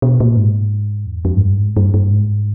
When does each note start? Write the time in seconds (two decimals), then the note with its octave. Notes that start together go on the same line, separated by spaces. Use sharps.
0.02 B2
0.20 A#2
0.37 G#2
1.06 E2
1.25 F2
1.37 G#2
1.41 G2
1.59 G#2
1.77 G2
1.94 G2
2.11 G#2